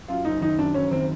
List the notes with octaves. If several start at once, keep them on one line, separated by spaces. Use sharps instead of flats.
F#2 F4
F#1 D#4
D#3 D#4
F#2 D4
F#1 C#4
D#3 C4